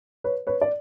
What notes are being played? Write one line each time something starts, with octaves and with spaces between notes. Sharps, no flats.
B4 C#5
B4 C#5
D5